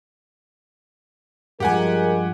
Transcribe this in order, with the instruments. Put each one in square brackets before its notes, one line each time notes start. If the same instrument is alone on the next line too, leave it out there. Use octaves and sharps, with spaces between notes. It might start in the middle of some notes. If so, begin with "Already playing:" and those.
[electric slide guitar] G2 F3 [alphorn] G#3 [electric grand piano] G4 F#5 G#5 [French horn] A#4